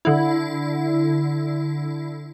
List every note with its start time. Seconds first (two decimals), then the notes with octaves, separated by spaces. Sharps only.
0.05 D3 E4